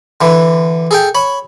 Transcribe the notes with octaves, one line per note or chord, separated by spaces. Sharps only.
D3 E3
G#4 A4 G5
C#5 B5